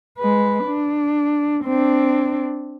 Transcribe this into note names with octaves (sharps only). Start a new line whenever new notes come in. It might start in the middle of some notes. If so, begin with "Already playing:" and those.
G#3 B4
D4
C4 D4